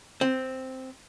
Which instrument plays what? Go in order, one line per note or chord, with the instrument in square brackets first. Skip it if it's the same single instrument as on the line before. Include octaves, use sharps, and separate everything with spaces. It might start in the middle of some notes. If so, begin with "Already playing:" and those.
[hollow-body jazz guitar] C4